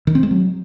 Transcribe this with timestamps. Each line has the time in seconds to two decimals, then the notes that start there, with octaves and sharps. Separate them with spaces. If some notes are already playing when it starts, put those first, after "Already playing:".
0.07 D#3
0.15 C4
0.23 G#3
0.31 F#3